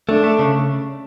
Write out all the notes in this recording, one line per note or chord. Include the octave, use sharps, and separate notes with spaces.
A3 D4
A3
C#3